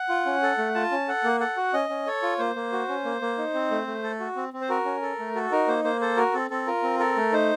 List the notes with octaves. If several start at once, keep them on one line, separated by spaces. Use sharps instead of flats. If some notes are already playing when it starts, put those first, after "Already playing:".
Already playing: F#5
F4
C#4
A4
A3
F4 A5
C#4
A4 F#5
A#3
A4 F#5
F#4
C#4 D#5
C#4
A4 C#5
F4
A#3 C5
A#3
F#4
C#4
A#3
A#3
D#4
C4
A3
A3
A4
F#4
C4
C4
C5
F#4 A#4
C#4
A4
A3
F#4 A4
D#4 A#4
A#3 C5
A#3 C5
A4 C5
F#4 A#4
C4 A4
C4 A4
F4 A#4
C4
A4 A#4
A3
D#4 C5